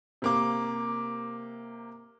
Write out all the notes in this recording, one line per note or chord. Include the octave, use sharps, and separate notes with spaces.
C3 A#3 D6